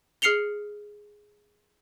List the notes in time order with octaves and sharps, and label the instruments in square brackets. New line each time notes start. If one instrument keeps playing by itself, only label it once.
[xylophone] G#4 F6 C7 C#7 F7 G7